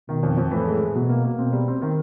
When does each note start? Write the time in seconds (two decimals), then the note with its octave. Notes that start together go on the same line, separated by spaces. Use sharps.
0.09 B2 D#3
0.23 F2
0.38 F2
0.51 A2 E3
0.66 G#3
0.81 E3
0.95 B2 F#3
1.09 A#3
1.24 A#3
1.38 B2 C4
1.53 G3
1.68 C4
1.82 D#3